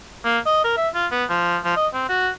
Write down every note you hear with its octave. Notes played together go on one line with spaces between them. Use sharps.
A#3
D#5
A#4
E5
F4
B3
F3
F3
D#5
C4
F#4